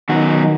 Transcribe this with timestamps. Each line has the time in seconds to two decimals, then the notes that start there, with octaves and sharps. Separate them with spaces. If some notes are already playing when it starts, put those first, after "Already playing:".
0.09 B2 D#3 F#3 C#4 F#4